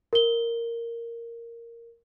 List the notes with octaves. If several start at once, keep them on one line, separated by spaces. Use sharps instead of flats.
A#4 G7